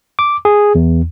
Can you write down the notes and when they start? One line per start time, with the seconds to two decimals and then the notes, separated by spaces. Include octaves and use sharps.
0.19 D6
0.45 G#4
0.75 E2